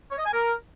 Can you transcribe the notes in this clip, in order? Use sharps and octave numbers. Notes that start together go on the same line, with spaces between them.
C#5
D#5
G#5
A#4